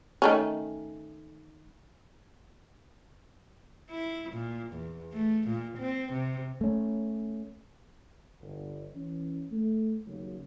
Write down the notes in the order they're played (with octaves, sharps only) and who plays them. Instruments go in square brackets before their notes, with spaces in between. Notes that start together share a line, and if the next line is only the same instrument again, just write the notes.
[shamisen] D#3 A3 C#4
[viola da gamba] E4
A#2
E2
A3
A#2
C4
C3
[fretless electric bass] A3 C#4
[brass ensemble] G1
E3 C#4
A3
D#2 C#3 F#3